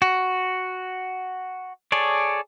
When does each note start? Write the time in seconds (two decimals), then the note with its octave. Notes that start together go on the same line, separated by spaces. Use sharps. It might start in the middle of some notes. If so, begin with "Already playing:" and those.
0.02 F#4
1.92 G#4 A4 C#5 D5